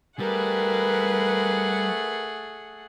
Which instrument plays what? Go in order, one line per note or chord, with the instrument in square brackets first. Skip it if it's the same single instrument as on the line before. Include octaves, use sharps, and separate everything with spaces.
[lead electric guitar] G3 [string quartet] A3 G#4 F#5 [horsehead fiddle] A#4 B4